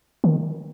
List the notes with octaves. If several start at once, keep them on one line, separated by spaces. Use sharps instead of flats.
D#3